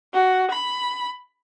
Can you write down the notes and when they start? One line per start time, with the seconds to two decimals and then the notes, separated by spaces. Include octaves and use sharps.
0.14 F#4
0.51 B5